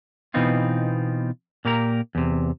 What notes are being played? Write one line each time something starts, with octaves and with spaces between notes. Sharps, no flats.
B2 E3 B3 C4 D#4 F4
A#2 A#3 G4 A#4 A#5
E2 C3